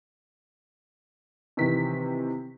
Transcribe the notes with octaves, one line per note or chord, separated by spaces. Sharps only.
C3 D#3 E3 B6